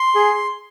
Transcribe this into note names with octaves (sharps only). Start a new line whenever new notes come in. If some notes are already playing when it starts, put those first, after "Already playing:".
Already playing: C6
G#4